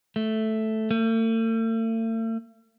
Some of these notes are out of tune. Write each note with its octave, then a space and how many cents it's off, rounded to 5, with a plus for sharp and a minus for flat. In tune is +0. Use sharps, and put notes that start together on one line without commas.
A3 -5
A3 +45